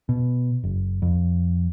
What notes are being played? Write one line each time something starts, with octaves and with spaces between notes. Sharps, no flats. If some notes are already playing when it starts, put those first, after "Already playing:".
B2
F#1
F2